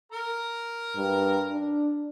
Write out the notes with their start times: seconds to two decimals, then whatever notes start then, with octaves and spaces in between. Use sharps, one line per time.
0.12 A#4 A#5
0.96 G2
1.51 D4